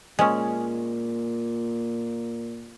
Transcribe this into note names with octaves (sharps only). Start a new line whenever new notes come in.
A#2 G#3 C#4